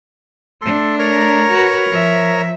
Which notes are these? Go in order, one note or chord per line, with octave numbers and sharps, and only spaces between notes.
A3 D4 A4 C6
A#4 C#5 A#5
F#4 B4
F3 E5